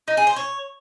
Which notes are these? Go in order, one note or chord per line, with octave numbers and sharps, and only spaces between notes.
D#4
G#4
C5
C#5